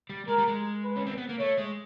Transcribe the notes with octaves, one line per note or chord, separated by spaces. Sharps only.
G3
G#3 A#4
G3
G#3
B4
C#4
C4
B3
A#3
A3 C#5
G#3